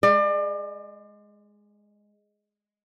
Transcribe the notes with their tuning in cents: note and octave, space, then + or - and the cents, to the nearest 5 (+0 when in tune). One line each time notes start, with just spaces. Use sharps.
G#3 +0 D5 +35